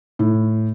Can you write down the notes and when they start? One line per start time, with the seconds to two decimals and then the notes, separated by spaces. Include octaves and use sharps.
0.19 A2